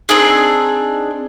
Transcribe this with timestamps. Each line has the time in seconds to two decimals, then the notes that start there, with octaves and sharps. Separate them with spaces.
0.09 C4 D4 D#4 G#4